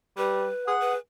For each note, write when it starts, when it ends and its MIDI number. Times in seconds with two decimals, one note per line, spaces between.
0.18 0.49 55
0.18 0.75 71
0.68 0.94 68
0.68 0.93 78
0.80 0.97 71